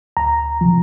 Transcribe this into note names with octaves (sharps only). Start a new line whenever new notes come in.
D2 A#5
C3 F3